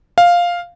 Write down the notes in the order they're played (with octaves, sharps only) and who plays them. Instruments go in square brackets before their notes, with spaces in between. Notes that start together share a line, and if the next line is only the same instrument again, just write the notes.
[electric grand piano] F5